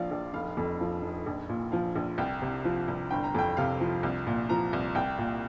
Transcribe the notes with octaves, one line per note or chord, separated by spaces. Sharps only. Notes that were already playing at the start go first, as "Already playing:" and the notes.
Already playing: A#1 A#2 F3 D5 F5
A#1
F1 F5
F2
F3
F1
A#1
A#2
F3 F5
A#1
C2 G5
C3
F3
C2
G1 G5
A#5
F2 G5
C3 F5
F3
C2
A#2
F3 A#5
C2
C2 G5
A#2